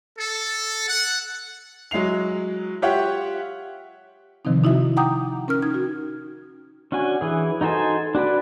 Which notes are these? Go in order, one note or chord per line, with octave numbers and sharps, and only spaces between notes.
A4
F#5
F#3 G#3 E4 C7 F7
F4 G4 C#5 E5 F#5 G5
C3 D#3 F3 C4 D#4
D#4 E4 F#4 E5
F#5 G5 A#5 D6 D#6 G6
C#4 A#4 F6
C#4 D#4 G#6
F#4
C#4 D4 F#4 G#5
E3 G#4
D#4 F#4 A4 C5 G#5
D4 F#4 B4 D5